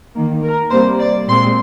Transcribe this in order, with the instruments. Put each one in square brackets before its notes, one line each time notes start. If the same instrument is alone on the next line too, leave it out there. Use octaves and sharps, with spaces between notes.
[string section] D#3 A#3
A#4
C3 G3 A#3 C5
D5
A#2 G#3 C4 C6